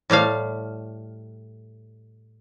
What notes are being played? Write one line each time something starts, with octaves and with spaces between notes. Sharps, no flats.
A2 G3 A3 F5